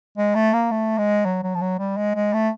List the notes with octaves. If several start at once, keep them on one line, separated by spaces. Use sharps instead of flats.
G#3
A3
A#3
A3
G#3
F#3
F#3
F3
F#3
G3
G#3
G#3
A3